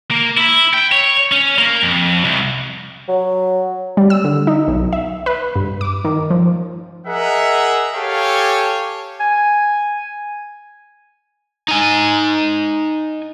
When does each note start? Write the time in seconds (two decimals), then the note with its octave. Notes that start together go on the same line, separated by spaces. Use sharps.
0.11 A#3
0.37 E4
0.74 G5
0.92 C#5
1.32 C#4
1.59 A#3
1.83 F2
2.24 C2
3.08 F#3
3.97 G3
4.10 E6
4.24 D3
4.47 D#4
4.68 B1
4.93 E5
5.26 B4
5.56 G2
5.81 D6
6.05 D#3
6.30 F3
7.07 G#4 A#4 D#5 E5 F#5
7.95 G4 A4 C#5 F5 G5 G#5
9.20 G#5
11.68 D#4 G#5